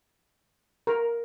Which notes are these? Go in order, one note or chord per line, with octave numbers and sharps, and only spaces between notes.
A#4